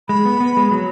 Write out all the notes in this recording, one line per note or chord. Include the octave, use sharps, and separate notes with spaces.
G#3 B5
B3
B3
G#3
F#3